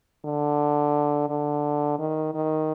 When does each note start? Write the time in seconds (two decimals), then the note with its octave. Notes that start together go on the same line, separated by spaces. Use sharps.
0.25 D3
1.29 D3
1.99 D#3
2.35 D#3